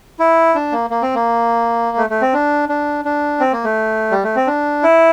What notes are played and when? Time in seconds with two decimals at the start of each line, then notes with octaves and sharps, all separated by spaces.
0.19 E4
0.55 D4
0.72 A#3
0.90 A#3
1.02 C4
1.15 A#3
1.97 A3
2.10 A3
2.22 C4
2.33 D4
2.69 D4
3.05 D4
3.40 C4
3.53 A#3
3.64 A3
4.11 G3
4.24 A3
4.36 C4
4.47 D4
4.83 E4